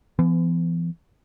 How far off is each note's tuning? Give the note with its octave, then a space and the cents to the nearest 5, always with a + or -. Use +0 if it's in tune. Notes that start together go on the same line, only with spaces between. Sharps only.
E3 +45 B3 +35